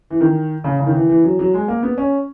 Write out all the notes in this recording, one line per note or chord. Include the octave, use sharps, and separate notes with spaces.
E3
D#3
C#3
C#3
D#3
E3
E3
F#3
F#3
G#3
A#3
B3
C#4